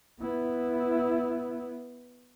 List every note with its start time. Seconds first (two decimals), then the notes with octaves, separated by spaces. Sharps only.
0.21 B3 E4